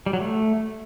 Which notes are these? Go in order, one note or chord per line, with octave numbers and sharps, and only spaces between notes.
G3
F#3
A3